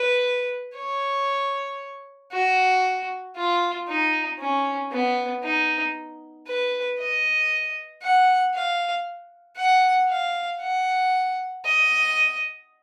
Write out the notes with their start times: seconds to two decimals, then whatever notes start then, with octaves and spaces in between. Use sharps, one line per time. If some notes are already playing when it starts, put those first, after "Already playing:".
Already playing: B4
0.77 C#5
2.32 F#4
3.36 F4
3.88 D#4
4.39 C#4
4.92 B3
5.43 D#4
6.47 B4
6.99 D#5
8.02 F#5
8.54 F5
9.57 F#5
10.09 F5
10.61 F#5
11.65 D#5